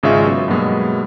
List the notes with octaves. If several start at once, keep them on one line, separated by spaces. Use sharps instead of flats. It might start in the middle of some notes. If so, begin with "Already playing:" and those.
G#1 C#3 G#3 F4 E5 C#6
F#3 B3
G2 B2 F#3 G#3 A#3 B3